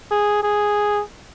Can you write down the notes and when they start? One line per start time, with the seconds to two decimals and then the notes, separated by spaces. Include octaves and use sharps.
0.11 G#4
0.43 G#4